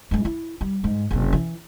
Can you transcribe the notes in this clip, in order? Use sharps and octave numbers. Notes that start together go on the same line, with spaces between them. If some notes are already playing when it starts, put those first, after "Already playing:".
G2 G#3
E4
G3
G#2
F#1 C3
E3